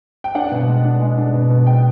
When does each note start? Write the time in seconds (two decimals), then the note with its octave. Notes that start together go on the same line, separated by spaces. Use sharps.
0.24 G5
0.35 D4 F#5
0.52 B2
0.68 G#3
0.85 D4
1.01 G#3
1.17 D4
1.34 B2
1.50 B2
1.66 G#3 G5